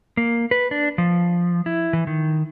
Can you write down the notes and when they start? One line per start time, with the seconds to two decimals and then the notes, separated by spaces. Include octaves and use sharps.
0.17 A#3
0.51 B4
0.71 D4
0.98 F3
1.66 E4
1.93 E3
2.07 D#3